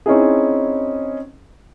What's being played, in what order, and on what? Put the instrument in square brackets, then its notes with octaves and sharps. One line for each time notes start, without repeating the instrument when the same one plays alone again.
[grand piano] C4 C#4 D#4 E4 G#4